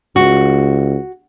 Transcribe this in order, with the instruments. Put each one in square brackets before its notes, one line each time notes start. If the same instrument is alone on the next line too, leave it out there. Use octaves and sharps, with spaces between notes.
[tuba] C#2 [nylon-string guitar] F#4